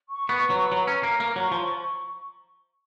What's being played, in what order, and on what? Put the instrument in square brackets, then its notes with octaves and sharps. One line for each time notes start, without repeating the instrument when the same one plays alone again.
[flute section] C#6
[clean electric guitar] B3
[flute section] B4
[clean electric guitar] F#3
[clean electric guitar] F#3 [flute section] A#5
[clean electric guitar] C#4
[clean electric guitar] A#3 [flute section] A#5
[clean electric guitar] A#3
[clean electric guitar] F#3 [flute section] C#6
[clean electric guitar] F3